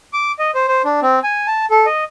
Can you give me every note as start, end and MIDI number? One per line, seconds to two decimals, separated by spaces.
0.13 0.32 86
0.39 0.51 75
0.55 0.66 72
0.68 0.82 72
0.85 1.00 62
1.02 1.19 60
1.24 1.47 80
1.47 1.65 81
1.70 1.86 69
1.86 2.04 75